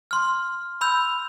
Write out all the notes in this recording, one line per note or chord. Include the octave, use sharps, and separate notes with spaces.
C6 F6
B5 E6 G6 F7